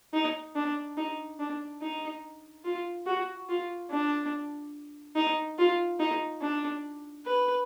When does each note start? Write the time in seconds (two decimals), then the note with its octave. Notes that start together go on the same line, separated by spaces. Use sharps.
0.13 D#4
0.55 D4
0.97 D#4
1.39 D4
1.82 D#4
2.64 F4
3.06 F#4
3.49 F4
3.90 D4
5.16 D#4
5.58 F4
5.99 D#4
6.41 D4
7.25 B4